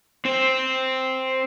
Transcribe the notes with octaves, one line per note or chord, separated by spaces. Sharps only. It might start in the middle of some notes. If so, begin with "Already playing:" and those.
C4 C5